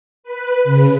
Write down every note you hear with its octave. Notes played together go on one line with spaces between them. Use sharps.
B4
C#3